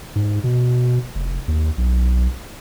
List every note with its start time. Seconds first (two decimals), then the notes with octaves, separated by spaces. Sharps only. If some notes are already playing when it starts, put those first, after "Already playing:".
0.16 G#2
0.44 B2
1.15 F1
1.48 D#2
1.78 B1